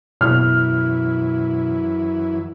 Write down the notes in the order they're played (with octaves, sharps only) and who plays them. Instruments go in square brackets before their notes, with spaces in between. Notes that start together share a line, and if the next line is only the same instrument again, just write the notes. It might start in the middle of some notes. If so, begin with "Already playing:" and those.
[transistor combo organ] F#2 E3 E4 [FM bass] B2 [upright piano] F6